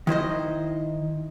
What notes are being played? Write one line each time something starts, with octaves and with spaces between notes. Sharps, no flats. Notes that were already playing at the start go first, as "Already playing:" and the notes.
D#3 E4 C5 D#5